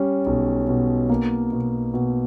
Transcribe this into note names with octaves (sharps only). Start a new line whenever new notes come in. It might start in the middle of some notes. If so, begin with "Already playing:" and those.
Already playing: G3 C#4
B1
B2
A#3
B2
B2